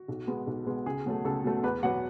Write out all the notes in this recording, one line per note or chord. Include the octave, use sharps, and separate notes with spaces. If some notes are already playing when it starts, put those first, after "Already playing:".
Already playing: F#4
B1
B2 G#3 B3
B1
B2 G#3 B3
C#2 G#4
B2 F#3 A3
C#2 A4
B2 F#3 A3
E2 B4
B2 F#3 B3 F#5